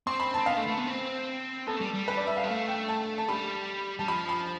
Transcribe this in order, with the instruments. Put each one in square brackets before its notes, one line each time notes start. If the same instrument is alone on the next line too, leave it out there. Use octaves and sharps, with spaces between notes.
[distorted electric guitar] C4 [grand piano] C6
[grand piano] B5
[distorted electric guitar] C4 [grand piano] A5
[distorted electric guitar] B3 [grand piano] F5
[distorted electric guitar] A3
A3
B3
C4
[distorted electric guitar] B3 [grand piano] A4
[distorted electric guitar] A3
G3
G3
[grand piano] B4
D5
E5
F5
[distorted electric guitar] B3
[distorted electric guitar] A3 [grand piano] F5
[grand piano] G5
A5
A5
[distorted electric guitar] G3 [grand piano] B5
[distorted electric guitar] G3 [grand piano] A5
[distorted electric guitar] F3 [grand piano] B5
[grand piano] B5